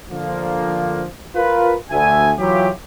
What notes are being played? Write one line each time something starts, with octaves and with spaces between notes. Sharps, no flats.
D3 F3 A#3
F4 A#4 B4
D2 E5 G#5
E3 F#3 F4 G4